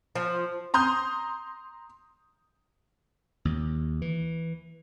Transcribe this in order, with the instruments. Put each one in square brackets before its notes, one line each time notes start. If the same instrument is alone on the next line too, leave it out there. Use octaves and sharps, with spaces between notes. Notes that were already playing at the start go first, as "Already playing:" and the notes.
[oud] F3
[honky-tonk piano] A#5 C6 D#6 G6
[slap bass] D#2
E3